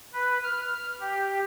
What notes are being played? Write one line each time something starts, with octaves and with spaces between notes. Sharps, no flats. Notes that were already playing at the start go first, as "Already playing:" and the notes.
B4
F6
G4